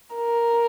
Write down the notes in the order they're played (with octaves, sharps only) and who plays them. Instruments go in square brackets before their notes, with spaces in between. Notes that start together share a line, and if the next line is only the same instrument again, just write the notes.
[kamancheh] A#4